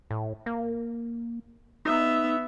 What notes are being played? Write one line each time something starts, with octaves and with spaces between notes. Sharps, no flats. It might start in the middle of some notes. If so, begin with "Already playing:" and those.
A2
A#3
B3 D#4 E5